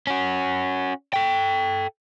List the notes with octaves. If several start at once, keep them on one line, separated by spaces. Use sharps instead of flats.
C#4 F#4
A4 G5